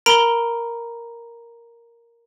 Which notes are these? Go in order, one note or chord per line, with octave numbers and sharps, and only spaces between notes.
A#4 A#5 B5 D7 G7